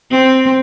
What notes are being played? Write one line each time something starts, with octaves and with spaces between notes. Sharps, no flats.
C4